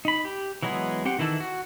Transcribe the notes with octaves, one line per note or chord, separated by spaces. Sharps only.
D#4 B5
G4
E3 F#3 G#3 B3 G#4
C4 G4 F#5
D#3 E3 E4 A4
F#4